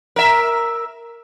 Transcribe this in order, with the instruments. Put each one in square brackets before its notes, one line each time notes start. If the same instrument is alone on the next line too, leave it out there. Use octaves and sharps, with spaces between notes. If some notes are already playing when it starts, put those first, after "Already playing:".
[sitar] A#4 E5